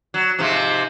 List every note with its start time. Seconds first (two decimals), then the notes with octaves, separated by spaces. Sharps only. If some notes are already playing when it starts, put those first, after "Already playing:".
0.14 F#3
0.39 G#2 C3 F3